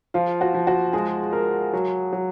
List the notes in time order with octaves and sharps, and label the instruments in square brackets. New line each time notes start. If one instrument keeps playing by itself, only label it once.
[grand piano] F3 [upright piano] F4
[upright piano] F#4
[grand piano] F3
[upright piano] F#4
[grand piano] G#3 [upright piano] G#4
[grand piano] A#4
F#3
F#3